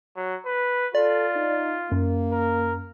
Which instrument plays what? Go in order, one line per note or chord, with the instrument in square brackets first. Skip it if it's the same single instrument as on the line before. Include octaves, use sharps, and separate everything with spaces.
[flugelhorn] F#3
B4
[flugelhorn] F4 [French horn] A4 [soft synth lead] D5
[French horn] D#4
[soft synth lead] F#2 [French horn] A#3
[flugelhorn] A#4